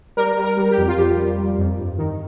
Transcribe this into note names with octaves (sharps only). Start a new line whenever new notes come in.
G3 A#4
G3
A#4
G3
G4
F2
F4
F2 G4
G3
G3
F2
G2
D#3